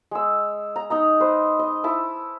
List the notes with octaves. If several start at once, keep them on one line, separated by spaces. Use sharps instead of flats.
G#3 E6
A#5
D#4 D#5 A#5
B4 C5
D#5
E4 A5 B5